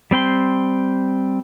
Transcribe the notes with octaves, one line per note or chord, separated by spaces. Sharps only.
G3 C4 G5 C6